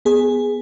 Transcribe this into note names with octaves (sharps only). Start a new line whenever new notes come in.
B3 G#4